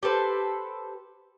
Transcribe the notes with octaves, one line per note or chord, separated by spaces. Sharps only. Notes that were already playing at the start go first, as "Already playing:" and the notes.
G4 A4 B4 C5